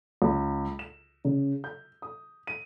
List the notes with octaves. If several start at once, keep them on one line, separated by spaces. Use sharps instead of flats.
C#2
E7
C#3
G6
D#6
D#7